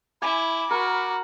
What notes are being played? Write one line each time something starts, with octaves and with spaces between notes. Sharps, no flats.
E4 G#5 B5 D6
F#4 A#4